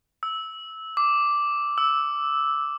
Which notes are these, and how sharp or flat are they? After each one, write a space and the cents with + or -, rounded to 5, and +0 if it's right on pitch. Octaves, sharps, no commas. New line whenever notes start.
E6 -15
D6 -5
E6 -5